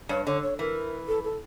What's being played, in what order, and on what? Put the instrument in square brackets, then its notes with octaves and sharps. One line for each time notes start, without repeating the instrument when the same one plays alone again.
[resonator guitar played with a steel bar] G2 [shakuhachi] C#5
[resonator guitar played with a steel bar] D3 [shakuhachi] C#5
[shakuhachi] C#5
[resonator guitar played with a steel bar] E3 [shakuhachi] A#4
[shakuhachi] A4
A4